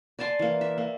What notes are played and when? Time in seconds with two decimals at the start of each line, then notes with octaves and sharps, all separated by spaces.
0.19 D5 G#5 A5 C6
0.39 E3 A#3
0.61 E5
0.78 A#3